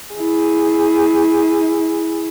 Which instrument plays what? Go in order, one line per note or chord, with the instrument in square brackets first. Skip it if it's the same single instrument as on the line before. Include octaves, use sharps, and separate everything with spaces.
[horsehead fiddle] E4 G#4